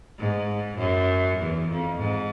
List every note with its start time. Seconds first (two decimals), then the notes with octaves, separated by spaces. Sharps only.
0.18 G#2
0.78 F#2
1.38 E2
1.69 F2
1.98 G#2